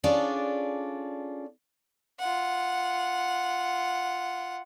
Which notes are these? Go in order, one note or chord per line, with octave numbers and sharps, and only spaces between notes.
C#4 D4 F4 G#4 A4 D5
F4 F#5